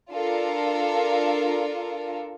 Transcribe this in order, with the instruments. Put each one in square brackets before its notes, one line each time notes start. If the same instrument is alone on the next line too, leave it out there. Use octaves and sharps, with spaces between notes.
[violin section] D4 F4 A4 A#4